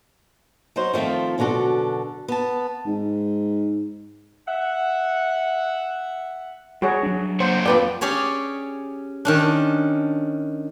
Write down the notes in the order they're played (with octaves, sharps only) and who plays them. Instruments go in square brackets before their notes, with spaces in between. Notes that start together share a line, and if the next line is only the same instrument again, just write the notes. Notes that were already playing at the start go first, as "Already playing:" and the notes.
[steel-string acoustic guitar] F#3 D#4 F#4 C5
D#3 F3 A3 C4 F4
F#2 B2 D3 F#4 A4 D5
B3 A5
[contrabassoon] G#2
[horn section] E5 F#5
[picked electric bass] G3 [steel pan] F#4 G#4 C#5
[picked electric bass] F#3 D4
[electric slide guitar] A#3 C#5 F#5 [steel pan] C5
[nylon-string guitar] F2 B4 G5 [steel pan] D5
[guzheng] C#4 G4 G#4 C#5 D5
D#3 C#4 D4